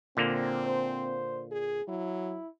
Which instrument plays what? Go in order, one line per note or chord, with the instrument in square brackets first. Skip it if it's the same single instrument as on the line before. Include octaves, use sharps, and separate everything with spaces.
[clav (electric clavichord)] A#2 D3 A#3 [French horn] C4
[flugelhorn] C5
[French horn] G#4
[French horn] F#3 [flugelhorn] E4